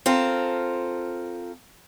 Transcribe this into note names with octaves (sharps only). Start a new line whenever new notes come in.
C4 F4 A4 A#4